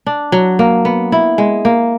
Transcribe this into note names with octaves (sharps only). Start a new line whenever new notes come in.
D4
F#3
A#3
B3
E4
G#3
A#3